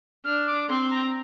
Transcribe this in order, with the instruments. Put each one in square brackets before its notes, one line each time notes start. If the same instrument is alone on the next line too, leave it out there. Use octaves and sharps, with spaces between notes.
[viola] D4 [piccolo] F6
[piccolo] D6
[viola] C4 [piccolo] C6
[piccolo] A#5